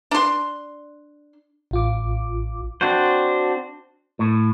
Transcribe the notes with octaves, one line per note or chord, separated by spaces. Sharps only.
D4 C6
A1 F4 D6
C4 D4 F#4 C5
A2